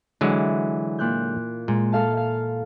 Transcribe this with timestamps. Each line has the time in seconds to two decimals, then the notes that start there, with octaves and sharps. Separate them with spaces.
0.21 D3 E3 F#3 G#3
0.98 A#2 F#6 G6
1.68 A#2 G#3
1.92 A4 F5 A5
2.17 F5